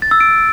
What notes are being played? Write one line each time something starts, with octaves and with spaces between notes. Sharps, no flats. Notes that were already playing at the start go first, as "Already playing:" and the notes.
A6
E6
D7